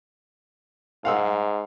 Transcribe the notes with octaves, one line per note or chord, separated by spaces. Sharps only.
G#2 F5 F#5 E6